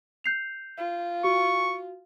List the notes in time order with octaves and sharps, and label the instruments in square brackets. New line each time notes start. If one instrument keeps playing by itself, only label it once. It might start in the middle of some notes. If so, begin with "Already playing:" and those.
[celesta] G6 C7 F7
[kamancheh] F4
[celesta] F#4 [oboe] C#6